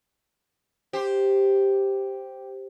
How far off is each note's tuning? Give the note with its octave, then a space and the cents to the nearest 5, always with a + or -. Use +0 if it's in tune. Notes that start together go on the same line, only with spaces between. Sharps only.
G4 +0 C5 +0